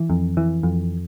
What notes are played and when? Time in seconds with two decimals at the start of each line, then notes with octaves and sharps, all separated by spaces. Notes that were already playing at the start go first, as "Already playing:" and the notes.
Already playing: E3
0.10 F2
0.37 E3
0.63 F2